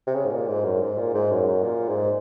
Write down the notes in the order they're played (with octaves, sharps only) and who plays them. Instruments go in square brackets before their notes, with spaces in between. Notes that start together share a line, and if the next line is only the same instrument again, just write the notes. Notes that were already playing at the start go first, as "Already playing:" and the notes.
[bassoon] C3
C#3
G#2
A#2
G#2
F#2
G#2
A#2
G#2
F#2
F#2
A#2
G#2